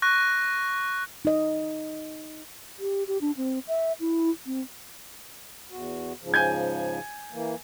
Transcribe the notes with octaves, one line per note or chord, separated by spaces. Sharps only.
C#6 F#6 A#6
D#4 D#5
G4
G4
D4
C4
E5
E4
C4
E2 F#4
G#2 C#3 F3
G#5 G6 G#6
E3 A#3